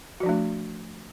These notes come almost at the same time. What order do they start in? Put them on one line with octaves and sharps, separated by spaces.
F#4 F3 D4 A3